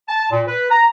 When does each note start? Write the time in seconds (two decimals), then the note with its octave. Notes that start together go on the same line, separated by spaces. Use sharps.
0.09 A5
0.31 A#2
0.48 B4
0.71 A#5